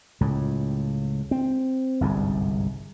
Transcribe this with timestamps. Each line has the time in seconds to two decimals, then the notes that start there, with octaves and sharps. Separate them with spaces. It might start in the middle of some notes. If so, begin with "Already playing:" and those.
0.21 C#2 A2
1.31 C4
2.01 G1 C2 G#2